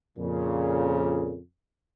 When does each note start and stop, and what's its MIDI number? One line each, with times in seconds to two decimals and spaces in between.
0.18 1.38 41
0.18 1.38 46
0.18 1.38 49